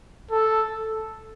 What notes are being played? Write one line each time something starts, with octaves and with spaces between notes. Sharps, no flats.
A4